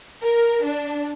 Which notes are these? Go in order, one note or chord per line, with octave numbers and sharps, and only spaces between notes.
A#4
D4